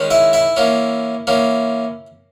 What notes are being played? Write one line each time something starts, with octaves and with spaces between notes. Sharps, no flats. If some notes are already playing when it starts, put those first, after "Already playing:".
Already playing: D#3 G#3 C#4
E4 E5
E4 E5
E3 A#3 C#4
E3 A#3 C#4